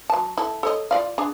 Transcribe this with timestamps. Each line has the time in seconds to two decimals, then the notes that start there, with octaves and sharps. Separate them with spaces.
0.10 F#3 A5
0.37 E4 A4
0.63 A4 C#5 D#5
0.91 F4 D5 F5
1.18 D4 G#4